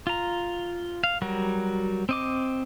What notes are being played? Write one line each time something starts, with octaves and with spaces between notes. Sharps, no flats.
F4 A#5
F5
F#3 G3 F#4 A#4
C4 D#5 D6